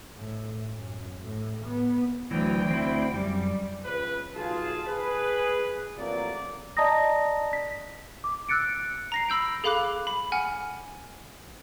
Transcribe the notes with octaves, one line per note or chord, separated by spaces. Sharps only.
A2
F#2
A2
B3
D2 E3 F#3 G5
C4 E4
F#2 G3
C#2 B4
B1 F4 G#4 A5
G#4 B4
A1 F2 F#3 A3 A#3 D5
D5 D#5 A5 A#5 D#6 A#6
B6
D6
E6 F#6 A6 C#7 D7
A#5 A#6 C7
B5 E6 G6 D7
G#4 A4 F5 B5 D6 F#6
B5
F#5 G#5 F6